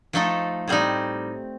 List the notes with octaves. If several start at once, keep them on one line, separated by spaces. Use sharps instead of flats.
F3 A3 D#4 A4
A2 G3 C4 D#4